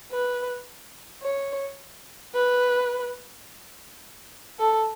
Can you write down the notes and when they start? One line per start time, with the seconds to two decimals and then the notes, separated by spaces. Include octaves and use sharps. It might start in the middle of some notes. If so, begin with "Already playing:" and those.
0.11 B4
1.22 C#5
2.34 B4
4.59 A4